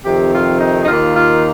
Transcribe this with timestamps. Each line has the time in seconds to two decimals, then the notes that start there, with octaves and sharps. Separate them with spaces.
0.04 F2 C3 D#3 G4
0.32 F4
0.60 D#4
0.83 D#4
0.88 D#2 D#3 A#3 F4
1.15 F4